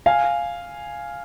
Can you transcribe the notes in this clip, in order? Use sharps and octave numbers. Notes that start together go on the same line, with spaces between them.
F5 G#5